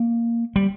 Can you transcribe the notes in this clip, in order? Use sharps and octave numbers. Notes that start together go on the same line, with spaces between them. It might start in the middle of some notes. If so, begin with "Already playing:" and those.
Already playing: A#3
G3